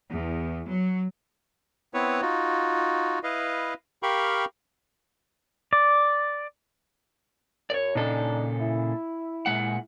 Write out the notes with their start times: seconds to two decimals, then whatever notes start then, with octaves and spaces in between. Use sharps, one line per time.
0.10 E2
0.68 F#3
1.94 B3 C4 E4 B4 C#5
2.21 D#4 F4 F#4
3.23 E4 B4 D#5 F5
4.03 G4 A#4 F5 G5 B5 C#6
5.73 D5
7.70 F#2 C#5 D5
7.95 A#2 C#3 D4 D#4 A4
8.61 E4
9.46 A#2 G#3 F#5